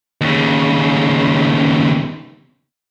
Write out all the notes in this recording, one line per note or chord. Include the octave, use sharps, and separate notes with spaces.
D#2 C#3